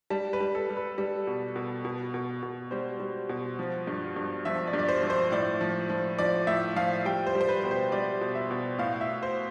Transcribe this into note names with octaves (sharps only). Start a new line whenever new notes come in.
G3 A5
B4
G3
A4
G3
B4
G3
B2
B2
B2
B2
B2
G3 C5
G3
B2
F3
G2
G2
F3 E5
D5
G2
D5
C5
F3
C5
A2 D5
F3
F3
F3 D5
A2 E5
F3 F5
G3 G5
C5
G3
C5
B4
B2
C5
G3 D5
B2
E5
B2
A2 F5
E5
A2
C5